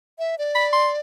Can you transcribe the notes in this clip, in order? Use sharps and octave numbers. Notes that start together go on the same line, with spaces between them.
E5
D5
B5
C6